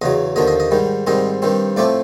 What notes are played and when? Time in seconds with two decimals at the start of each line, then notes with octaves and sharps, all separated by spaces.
0.02 E2 C#3 F#3 D#5
0.36 D#2 D3 F3 A#3 D#5
0.47 D#5
0.60 D#5
0.71 G#2 D#3 G3
1.07 G#2 D#3 G3 C4 D#5
1.42 G2 D#3 G3 C4
1.77 A2 F3 A3 C4 D5